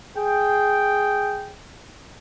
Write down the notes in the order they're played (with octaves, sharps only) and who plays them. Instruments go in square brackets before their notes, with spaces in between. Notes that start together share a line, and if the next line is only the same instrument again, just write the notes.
[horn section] G#4 G5